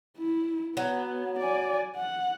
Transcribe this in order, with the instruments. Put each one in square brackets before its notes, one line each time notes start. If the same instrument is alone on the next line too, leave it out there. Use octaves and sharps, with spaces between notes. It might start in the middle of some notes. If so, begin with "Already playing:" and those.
[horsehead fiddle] E4
[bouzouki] F#3 [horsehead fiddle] B3
[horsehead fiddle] D5 G#5
F#5